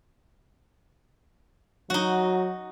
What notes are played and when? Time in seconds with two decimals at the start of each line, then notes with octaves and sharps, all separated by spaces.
1.90 F#3 D#4 F#4